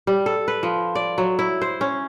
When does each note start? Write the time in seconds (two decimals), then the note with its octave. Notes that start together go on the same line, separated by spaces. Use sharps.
0.07 G3
0.26 A4
0.48 B4
0.63 F3
0.95 D5
1.18 F#3
1.39 E4
1.62 C5
1.81 C#4